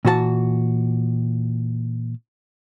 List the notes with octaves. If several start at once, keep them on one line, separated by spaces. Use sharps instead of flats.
A#2 E3 F#4 G#4 A5